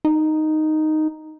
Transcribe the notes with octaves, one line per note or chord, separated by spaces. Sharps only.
D#4